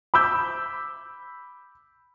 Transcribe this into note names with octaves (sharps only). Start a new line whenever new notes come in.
B5 D6 E6 G6